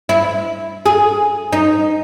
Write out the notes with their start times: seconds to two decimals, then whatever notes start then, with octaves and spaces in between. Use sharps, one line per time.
0.09 E4
0.86 G#4
1.53 D#4